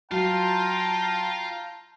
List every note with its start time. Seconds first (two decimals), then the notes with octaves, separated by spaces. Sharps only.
0.12 F#3 F4 F5 G5 A5 A#5